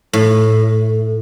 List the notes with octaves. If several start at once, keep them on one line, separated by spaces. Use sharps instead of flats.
A2